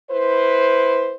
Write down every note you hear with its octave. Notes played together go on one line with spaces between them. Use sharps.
E4 B4 C5